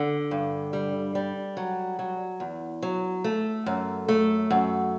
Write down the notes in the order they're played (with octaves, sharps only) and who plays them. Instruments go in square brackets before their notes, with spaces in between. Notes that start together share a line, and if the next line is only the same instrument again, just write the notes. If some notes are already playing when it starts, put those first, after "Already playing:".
Already playing: [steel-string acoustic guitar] D3
G2
G3
G3
F#3
F#3
E2
F#3
A3
F#2
A3
F#2